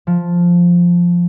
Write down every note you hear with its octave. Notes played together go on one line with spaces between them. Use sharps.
F3